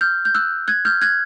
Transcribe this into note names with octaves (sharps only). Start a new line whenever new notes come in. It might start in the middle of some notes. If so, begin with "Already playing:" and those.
F6 G6
G6
E6 F#6
F#6 G#6
F6 G6
F#6 G#6